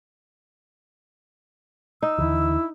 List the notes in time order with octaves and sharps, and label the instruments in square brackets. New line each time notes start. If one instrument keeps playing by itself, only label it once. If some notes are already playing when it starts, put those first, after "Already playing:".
[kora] D#4 [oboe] E6
[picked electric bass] D#2 D3 E3 [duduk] E4